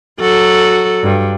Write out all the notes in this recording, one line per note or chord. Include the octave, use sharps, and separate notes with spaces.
F#3 F#4 A4
G2